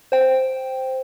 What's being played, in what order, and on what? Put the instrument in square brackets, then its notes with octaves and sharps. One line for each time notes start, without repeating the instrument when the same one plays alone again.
[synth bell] C5 G5